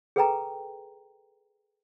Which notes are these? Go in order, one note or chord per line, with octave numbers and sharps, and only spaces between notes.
G#4 A4 B4 G5 G#5 A#5